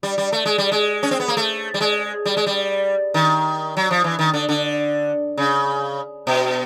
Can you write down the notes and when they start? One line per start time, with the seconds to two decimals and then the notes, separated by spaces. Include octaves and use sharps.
0.03 G3
0.18 G3
0.32 A3
0.46 G#3
0.58 G3
0.72 G#3
1.03 C#4
1.11 C4
1.20 B3
1.28 A#3
1.37 A3
1.74 G3
1.81 G#3
2.26 G3
2.37 G#3
2.47 G3
3.14 D#3
3.77 F#3
3.91 F3
4.04 E3
4.19 D#3
4.33 D3
4.49 D3
5.37 C#3
6.27 B2